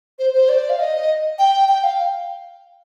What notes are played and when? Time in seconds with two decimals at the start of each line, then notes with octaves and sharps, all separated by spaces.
0.19 C5
0.34 C5
0.49 D5
0.70 F5
0.79 D#5
1.39 G5
1.69 G5
1.84 F5